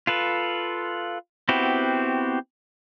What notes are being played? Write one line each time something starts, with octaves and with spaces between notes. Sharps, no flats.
F4 A4 B4
B3 C4 E4 F#4 G4